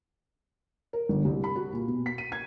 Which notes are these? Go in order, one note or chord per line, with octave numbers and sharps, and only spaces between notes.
A#4
G1
C2
B5
F#4
A#2
B2
B6
D#7
G#6